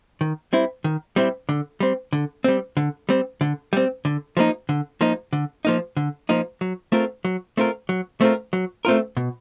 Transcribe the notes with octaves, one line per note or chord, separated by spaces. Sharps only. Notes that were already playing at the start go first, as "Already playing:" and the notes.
D#3
G3 C4 E4
D#3
G3 C4 E4
D3
G3 C4
D3
G3 C4
D3
G3 C4
D3
G3 C4
D3
F3 A#3 D#4
D3
F3 A#3 D#4
D3
F3 A#3 D#4
D3
F3 A#3 D#4
F#3
A3 C4 F4 A#4
F#3
A3 C4 F4 A#4
F#3
A3 C4 F4 A#4
F#3
A3 C4 F4 A#4
B2